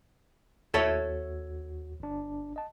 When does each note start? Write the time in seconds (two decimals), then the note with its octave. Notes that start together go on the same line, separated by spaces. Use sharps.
0.74 D#2 F#4 A4 C#5 E5
2.00 G1 D4
2.56 D#5 A5